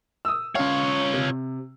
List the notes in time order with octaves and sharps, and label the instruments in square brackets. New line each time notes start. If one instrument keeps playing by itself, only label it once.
[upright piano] D#6 E6
[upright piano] C#4 F5 [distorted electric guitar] F4 C#5
[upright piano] C3